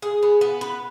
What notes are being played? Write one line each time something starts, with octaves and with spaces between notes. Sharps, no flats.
G#4
B3
B3
B4